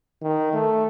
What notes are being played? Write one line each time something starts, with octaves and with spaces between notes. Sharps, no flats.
D#3
A3